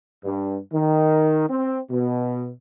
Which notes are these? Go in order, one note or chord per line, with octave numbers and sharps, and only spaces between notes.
G2
D#3
C4
B2